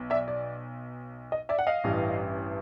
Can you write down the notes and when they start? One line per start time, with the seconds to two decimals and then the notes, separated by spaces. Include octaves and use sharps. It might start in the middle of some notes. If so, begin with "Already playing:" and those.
Already playing: B1
0.10 D5 E5
0.28 D5
1.32 D#5
1.49 D5 E5
1.59 F#5
1.67 D#5 F5
1.84 A1 G2 E3